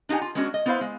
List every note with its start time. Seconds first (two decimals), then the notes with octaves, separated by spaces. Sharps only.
0.09 D4 D#4 G4 F#5 G#5
0.21 F4
0.35 G#3 B3 C#4 D4 F#4
0.54 D#5
0.66 B3 E4 B4 C5 F5
0.81 G#3